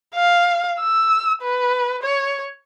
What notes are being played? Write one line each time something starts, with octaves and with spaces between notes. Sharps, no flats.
F5
E6
B4
C#5